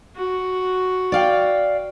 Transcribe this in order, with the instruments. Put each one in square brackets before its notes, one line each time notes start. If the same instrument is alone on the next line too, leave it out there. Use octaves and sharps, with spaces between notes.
[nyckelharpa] F#4
[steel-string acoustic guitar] D5 F5 G5